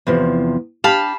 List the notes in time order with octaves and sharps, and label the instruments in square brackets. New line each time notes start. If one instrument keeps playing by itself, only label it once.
[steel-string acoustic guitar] E2 C3 F3
[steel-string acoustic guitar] D4 G4 [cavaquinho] F5 A5 B5